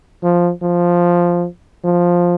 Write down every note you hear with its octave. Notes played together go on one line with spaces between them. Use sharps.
F3
F3
F3